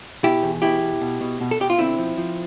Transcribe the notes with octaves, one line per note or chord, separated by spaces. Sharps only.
B2 E4 G4
E2
B2 E4 G4
B2
B2
B2
B2
A4
B2 G4
F4
D3 C4 E4
F3
F3